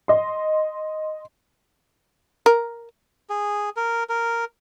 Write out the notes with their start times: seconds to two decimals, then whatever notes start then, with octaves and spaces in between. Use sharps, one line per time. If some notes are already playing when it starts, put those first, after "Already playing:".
0.08 D#5 C6
2.46 A#4
3.29 G#4
3.76 A#4
4.09 A#4